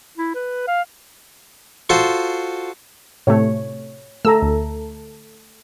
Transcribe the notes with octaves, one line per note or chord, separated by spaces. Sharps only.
E4
B4
F5
F4 F#4 A4 C5
A2 C3 A3 C#5
A3 A4 A#5 E6
D2